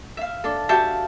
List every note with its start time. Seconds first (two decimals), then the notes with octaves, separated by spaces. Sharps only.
0.17 E5 F5
0.44 D4 A4
0.69 F#4 G4 E5 F5 G5 A5